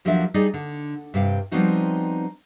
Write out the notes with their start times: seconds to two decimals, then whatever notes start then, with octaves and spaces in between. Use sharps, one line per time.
0.05 D#2 F3 F#3 D4 A4 E5
0.34 G3 D#4 G#4 D5 D#5
0.54 D3
1.14 G2 C3 F5 G5
1.51 F3 G3 B3 C4 D#4 F#4